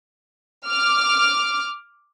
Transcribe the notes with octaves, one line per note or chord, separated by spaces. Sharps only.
D6 F6